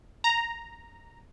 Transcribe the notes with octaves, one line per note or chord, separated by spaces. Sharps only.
A#5